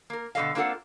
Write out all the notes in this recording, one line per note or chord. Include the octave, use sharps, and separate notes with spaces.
A#3 A#4
B2 D3 G3 A4 D#5 F5
A#3 C4 D4 F4 A4 F#5